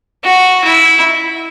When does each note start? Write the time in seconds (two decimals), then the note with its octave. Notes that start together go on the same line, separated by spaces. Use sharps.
0.24 F#4
0.64 E4